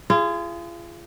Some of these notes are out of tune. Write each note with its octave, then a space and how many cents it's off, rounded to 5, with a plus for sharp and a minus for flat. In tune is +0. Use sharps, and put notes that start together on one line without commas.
F4 -35 G#4 +0